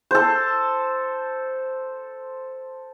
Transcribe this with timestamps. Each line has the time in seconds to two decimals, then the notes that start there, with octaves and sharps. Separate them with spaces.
0.11 A4 C5